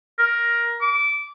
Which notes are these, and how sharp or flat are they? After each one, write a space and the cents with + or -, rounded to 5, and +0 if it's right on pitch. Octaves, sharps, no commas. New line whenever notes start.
A#4 +15
D6 -20